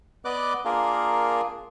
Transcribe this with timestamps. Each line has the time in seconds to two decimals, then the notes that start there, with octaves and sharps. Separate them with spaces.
0.25 B3 B4 D5 D#5 D6 F#6
0.65 A#3 D4 F4 G#4 A#4